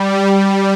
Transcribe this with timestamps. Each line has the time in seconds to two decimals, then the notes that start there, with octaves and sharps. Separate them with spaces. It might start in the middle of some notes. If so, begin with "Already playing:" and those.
Already playing: G3
0.28 G3